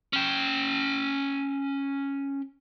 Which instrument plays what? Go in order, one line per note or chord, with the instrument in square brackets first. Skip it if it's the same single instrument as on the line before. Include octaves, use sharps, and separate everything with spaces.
[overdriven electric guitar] C#4 G5